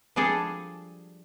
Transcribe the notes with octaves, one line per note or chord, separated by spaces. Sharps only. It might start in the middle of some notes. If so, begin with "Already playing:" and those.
F3 G3 D4 G#4 A4